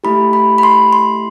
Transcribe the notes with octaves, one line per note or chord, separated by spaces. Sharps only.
A3 E4 G4 B5
B5
B5
C6
C6